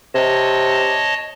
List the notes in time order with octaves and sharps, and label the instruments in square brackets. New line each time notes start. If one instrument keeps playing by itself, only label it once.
[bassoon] C3 [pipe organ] C#5 D#5 A5